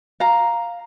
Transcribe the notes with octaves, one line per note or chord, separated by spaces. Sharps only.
F5 A#5